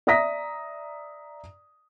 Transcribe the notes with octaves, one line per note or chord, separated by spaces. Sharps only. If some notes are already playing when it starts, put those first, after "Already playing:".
D5 E5 A#5 D#6 A#6 B6